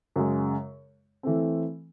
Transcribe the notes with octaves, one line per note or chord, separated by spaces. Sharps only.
F#2 C#3 G#3
E3 A3 C4